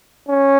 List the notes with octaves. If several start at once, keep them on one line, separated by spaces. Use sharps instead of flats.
C#4